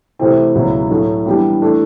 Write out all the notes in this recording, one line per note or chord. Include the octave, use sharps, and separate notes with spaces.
C3 E3 A3 C4 E4
C#2 B2 F#3 B3 E4
A2 F#3 A3
E3 G3 B3 D4 G4
E3 A3 D4